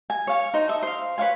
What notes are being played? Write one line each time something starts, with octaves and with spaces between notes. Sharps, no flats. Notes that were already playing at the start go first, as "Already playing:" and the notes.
G#5
C#5 F5 G#5
D#4 C5
A4 E5 D#6
C5 F5
B4 C#5 F5 G#5